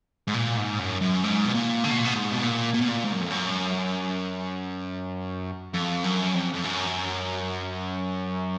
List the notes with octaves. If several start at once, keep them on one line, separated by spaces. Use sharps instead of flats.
G#2
A#2
G#2
F#2
F#2
G#2
B2
A#2
D3
B2
A#2
B2
G#2
B2
A#2
A#2
B2
A#2
G#2
F#2
F2
F#2
F2
F#2
F2
F2
F#2